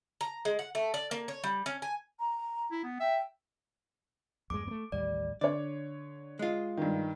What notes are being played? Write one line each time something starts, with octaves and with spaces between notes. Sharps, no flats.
A#5
G#3
F#5
A3
D5
A#3
C#5
G3
C#4
G#5
A#5
E4
B3
E5 G5
E2 G2 G#3 D6
A3 B3
A1 D#2 G3 D5
D3 C#5 D5
G#3 F4
G2 D#3